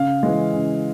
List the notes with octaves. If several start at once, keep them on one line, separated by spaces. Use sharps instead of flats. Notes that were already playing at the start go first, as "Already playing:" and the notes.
Already playing: C#3 F5
E3 G#3
C#3